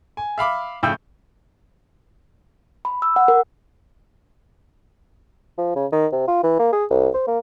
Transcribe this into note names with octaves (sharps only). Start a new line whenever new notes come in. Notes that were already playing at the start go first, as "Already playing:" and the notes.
G#5
E5 F5 B5 D6
A#1 A2 C#3 G5 E6 G6
B5
E6
F#5
A#4
F3
C#3
D#3
C3
F4
E3
A#3
G#4
C2
C5
A#3